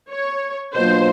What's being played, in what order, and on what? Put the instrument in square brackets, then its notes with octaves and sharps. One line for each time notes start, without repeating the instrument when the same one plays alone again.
[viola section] C#5
[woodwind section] B2 F#3 A#3 D4 F4 [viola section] C5